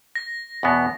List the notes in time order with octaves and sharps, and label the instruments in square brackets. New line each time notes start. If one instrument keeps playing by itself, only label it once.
[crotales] A#6
[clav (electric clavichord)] E2 B2 B3